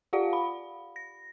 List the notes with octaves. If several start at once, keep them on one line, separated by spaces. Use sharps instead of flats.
F4 G4 D5 F5 F#5
B5
A#6